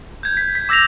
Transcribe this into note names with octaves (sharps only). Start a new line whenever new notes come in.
G6 G#6
B6
B6
D6 E6 G6 A#6 B6 F7